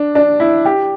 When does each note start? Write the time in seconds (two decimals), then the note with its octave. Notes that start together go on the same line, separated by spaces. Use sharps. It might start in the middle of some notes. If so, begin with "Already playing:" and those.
Already playing: D4
0.15 D4
0.40 E4
0.65 G4